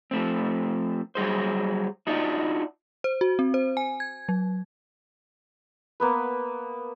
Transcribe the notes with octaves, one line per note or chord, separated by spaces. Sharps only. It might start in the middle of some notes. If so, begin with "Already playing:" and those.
F3 A3 C4
F#3 G3 G#4 C5
D4 D#4 F4 F#4 D5 E5
C5
F#4
C4
C5
G#5
G#6
F#3
A#3 B3 B4